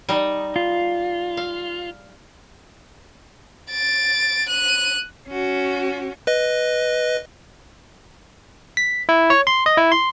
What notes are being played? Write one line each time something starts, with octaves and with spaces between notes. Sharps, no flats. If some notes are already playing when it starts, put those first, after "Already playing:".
G3 D#4
F4
F5
A6 D7
F#6 D#7
C#4 F#4
B4 D#5
B6
E4
C#5
C6
D#5
E4
C6